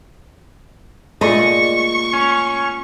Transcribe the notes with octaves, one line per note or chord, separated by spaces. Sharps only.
A#2 G#3 A3 D5 D#5 C#6
C#4